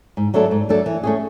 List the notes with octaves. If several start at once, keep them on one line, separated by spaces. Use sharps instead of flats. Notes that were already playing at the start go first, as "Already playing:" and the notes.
G#2
F#3 A3 D4 A4
G#2
F#3 A3 D4 A4
E3
A3 C#4 G#4